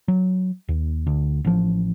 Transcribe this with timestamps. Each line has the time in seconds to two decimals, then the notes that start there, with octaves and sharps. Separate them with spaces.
0.08 F#3
0.69 D#2
1.07 D2
1.45 A1 F3